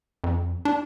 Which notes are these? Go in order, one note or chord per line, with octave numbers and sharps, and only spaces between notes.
F2
D4